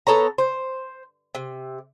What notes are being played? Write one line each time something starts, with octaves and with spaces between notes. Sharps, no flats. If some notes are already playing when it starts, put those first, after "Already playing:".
B3 A4 C#5 A#5
C5
C3